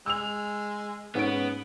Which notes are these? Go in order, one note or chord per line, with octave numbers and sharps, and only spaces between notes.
G#3 E6 F7
G#2 B3 C#4 D7